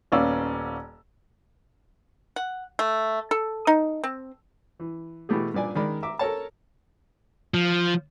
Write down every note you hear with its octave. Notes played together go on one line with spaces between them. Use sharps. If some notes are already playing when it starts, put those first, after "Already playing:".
D#1 B3 C#4 D5 F5 E6
F#5
A3
A4
D#4
C4
E3
B2 E3 A3 G4 G#4
G2 A#2 D5 G#5
D#3 G#3 A#4 D5 B5
E5 A#5 D6
A4 A#4 C#5 A5
F3